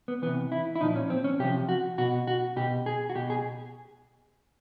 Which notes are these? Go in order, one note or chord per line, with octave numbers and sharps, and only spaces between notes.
B3
C3 E3 B3
E4
E4
A#2 F3 D#4
C#4
C4
C#4
C3 F3 G4
F#4
B2 F#4
F#4
B2 G4
G#4
F#4
B2 G4
G#4